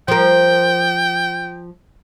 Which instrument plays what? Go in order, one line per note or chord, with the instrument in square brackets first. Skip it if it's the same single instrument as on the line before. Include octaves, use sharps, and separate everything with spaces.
[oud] F3 A#4 [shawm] G5